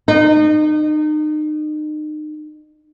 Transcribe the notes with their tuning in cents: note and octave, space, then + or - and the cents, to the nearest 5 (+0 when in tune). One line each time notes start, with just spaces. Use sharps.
D#4 -35